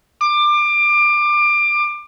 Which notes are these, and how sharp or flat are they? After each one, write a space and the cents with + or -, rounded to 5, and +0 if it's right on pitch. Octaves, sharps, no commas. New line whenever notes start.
D6 +25